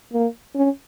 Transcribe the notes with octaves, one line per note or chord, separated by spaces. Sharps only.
A#3
C#4